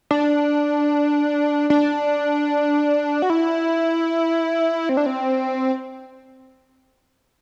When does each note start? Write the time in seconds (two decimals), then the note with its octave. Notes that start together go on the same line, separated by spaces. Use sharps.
0.11 D4
1.70 D4
3.22 F#4
3.30 E4
4.89 C4
4.97 D4
5.06 C4